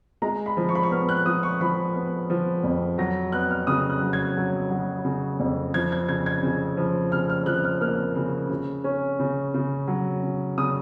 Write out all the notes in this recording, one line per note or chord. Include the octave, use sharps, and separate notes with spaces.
G#3 A#5
B5
F3
C#6
B5
C#6
B3 F6
F#6
F3 D#6
C#6
F3 B5
B3
F3
F2
F#3 A#6
B3 F#6
F6
C#3 D#6
F#6
F#3
G#6
F#3
F#3
C#3
F2
F3 G#6
G#6
C#3 G#6
G#6
C#3
F3
C#3 F6
F6
F3 F#6
F6
A#3 F6
C#3
C#3
C#4
C#3
C#3
F#3
C#3
C#3 D#6